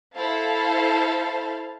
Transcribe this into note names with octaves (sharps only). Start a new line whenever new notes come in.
E4 A4 C5 F5 A5